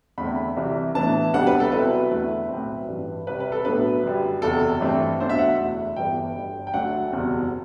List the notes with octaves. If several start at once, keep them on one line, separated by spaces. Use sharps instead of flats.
E2 D3 A3 C4 B5
C2 C3 E3
A2 E3 B3 D4 A5
D2 C3 G3 B3 D4 F#5
B4
A4
C2 B2 F#3 C4 E4 B4
E2 D3 A3 E4
B1 A2 F#3 C4
A1 G2 E3
C2 C3 G3 B4
B4
A4
B1 A2 F#3 B3 D4 B4
F#2 D3 G3
F#1 E2 C3 A4
G2 E3 A3 C4 E4
B1 B2 A3 D4 C5
E5
F#5
F#1 E2 B2 A3 E4
G1 G2 E3 B3 G5
G1 G2 D3
G5
D2 D3 F#3 A3 D4 F#5
F#1 E2 B2 G3 C4